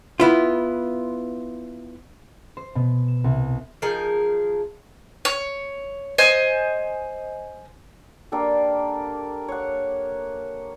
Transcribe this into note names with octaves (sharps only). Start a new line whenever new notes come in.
B3 E4 F4
C5
B2
E7
C2
F3 D#4 G#4 A#4
C#5
C5 D#5 G#5
A#3 D4 G4 A4
C#5 F#5